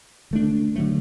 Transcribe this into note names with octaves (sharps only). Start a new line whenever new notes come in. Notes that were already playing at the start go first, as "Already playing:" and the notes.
D3 A3 D4
D3 F#3 A3